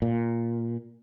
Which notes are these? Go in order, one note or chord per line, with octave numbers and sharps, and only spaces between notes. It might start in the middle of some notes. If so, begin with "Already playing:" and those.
A#2